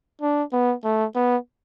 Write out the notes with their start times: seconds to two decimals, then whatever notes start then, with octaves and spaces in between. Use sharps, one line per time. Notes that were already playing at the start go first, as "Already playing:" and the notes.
0.21 D4
0.53 B3
0.84 A3
1.15 B3